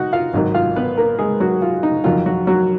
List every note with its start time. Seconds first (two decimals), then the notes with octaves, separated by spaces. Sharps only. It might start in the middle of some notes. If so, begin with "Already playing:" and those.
Already playing: D#4 F#4 F#5
0.13 F4 F5
0.34 G#1 G#2 D#3 F#3
0.54 F4 F5
0.76 B3 B4
0.98 A#3 A#4
1.19 G#3 G#4
1.40 F#3 F#4
1.62 F4
1.83 D#4
2.04 F2 D#3 F#3 F4
2.26 F#3 F#4
2.47 F#3 F#4